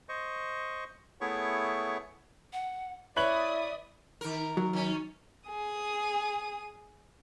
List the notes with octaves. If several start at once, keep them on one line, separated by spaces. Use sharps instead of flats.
C5 D#5 C#6
A3 B3 E4 G#4 C#5 C#6
F#5
E4 B4 C#5 D5 E5 B5 D#6 F#7
D#3 A#4
F#3
D#3 C#4
G#4 D#6